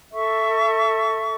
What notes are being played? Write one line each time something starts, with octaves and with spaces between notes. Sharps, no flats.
A4 E5 C#6